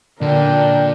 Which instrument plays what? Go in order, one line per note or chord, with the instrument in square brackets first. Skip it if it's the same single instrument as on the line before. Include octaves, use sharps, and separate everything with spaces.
[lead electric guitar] A#2 D5 [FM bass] D3 [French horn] D4 [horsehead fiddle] A#4 G5